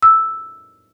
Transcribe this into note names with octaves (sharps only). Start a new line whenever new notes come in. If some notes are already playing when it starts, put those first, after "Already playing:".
E6